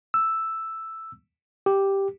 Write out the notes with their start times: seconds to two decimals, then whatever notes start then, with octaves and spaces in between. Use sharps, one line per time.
0.14 E6
1.66 G4